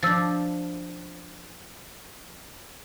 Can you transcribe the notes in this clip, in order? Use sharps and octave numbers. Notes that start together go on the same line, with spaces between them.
F3 D4 E6 A6